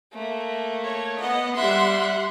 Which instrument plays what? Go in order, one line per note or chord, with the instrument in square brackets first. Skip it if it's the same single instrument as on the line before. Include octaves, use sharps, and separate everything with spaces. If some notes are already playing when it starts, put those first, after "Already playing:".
[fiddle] A3 A#3
[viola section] C#5
[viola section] B3 D#5 [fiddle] F#5
[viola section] G3 F#5 C6 [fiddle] E5